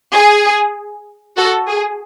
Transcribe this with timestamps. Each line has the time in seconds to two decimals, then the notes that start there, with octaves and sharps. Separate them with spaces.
0.15 G#4
1.38 F#4 A4
1.68 G#4